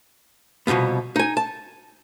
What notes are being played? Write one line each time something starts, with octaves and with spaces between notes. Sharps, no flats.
C2 F2 G#2 B2 B3
D#4 G#5
A5